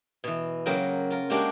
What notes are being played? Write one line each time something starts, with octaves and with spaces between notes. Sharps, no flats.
B2 E3
C#3 F#3 A#3 A#4 G5
F4 A#4
G#3 A#3 D4 F#4 G4 G5